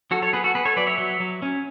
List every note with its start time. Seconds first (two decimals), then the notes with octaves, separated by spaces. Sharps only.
0.11 F#3 F#4 A4
0.22 A4 C#5
0.33 B3 G#4 B4
0.44 F#4 A4
0.55 B3 G#4 B4
0.65 A4 C#5
0.76 F#3 B4 D5
0.87 C#5 E5
0.98 F#3
1.20 F#3
1.42 C#4